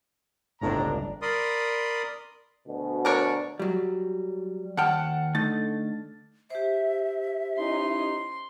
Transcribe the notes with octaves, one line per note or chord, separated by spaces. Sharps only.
G1 C#2 A2 C4 D4 A#5
A#4 D5 B5 C6 D#6
D2 B2
D4 A#4 C#5
F#3 G3
D#2 F#5 G5 A5 F6
D3 A3 D#4 A6
G4 C5 E5
C#4 D#4 E4 C6